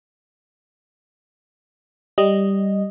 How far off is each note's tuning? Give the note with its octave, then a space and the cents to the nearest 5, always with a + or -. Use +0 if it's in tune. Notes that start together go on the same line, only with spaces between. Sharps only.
G3 +0 D#5 -5